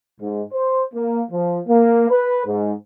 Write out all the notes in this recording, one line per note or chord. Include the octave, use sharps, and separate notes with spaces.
G#2
C5
A#3
F3
A#3
B4
G#2